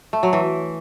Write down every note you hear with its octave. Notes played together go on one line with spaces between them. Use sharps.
A3
F#3
E3